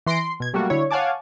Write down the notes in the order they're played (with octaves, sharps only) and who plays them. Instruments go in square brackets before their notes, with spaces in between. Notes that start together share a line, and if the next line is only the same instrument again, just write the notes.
[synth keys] E3 C6 A#6 C7 D7
C6
B2 G#6
F#3 G3 A3 A#3 F#4
D3 E4 C#5
C#5 F5 F#5 G#5 A5 D6